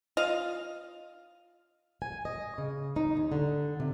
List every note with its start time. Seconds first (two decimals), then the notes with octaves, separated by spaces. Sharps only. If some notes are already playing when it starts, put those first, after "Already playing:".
0.17 F4 D#5 F5
2.02 G#5
2.25 D#5
2.58 C#3
2.96 D#4
3.17 D#2
3.32 D3
3.80 C3